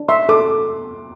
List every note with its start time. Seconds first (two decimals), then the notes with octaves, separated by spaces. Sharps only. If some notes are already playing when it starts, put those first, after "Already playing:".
Already playing: D4
0.08 E5 C6
0.29 A4 D6